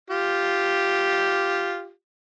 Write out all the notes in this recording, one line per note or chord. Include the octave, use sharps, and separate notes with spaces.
F4 G4